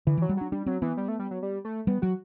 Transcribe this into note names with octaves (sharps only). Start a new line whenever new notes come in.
D3 E3
E3
F#3
G3
F#3 D4
G3 D4
F#3 C4
E3 B3
G3
A3
G3
F#3
G3
A3
G3 B3
F#3 F#4